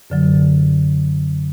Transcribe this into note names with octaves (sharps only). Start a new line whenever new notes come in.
F#2 D3 F#3